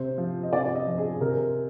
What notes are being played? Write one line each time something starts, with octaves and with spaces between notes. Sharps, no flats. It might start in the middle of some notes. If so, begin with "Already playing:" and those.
Already playing: C3 C5
F3
D#5
C3 D5
D#5
F3
G#4
C3 A#4